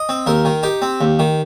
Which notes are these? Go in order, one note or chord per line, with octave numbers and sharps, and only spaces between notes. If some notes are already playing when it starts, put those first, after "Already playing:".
Already playing: D#5
C4
D#2 A#4
D#3
D#4 G4
C4
D#2
D#3